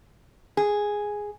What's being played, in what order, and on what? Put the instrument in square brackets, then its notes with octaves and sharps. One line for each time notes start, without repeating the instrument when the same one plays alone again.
[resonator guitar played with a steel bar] G#4